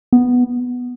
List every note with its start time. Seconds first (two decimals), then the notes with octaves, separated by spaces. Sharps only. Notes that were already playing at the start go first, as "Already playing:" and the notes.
0.13 B3